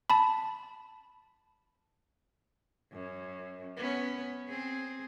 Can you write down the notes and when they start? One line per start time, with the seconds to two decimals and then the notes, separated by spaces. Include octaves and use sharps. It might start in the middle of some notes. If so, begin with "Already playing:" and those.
0.10 A5 B5
2.92 F#2
3.77 B3 C#4
4.49 C4 G#4